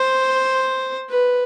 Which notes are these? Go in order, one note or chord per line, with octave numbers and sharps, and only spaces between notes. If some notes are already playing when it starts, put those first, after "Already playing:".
Already playing: C5
B4